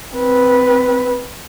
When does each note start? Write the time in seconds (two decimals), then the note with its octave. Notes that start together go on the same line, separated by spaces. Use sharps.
0.14 C4 B4